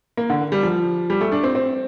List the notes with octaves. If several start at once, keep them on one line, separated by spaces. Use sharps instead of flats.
A#3
D3
G3
F3
G3
A3
D4
C4
C4